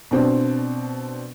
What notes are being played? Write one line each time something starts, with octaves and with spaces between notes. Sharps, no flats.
B2 C4 D4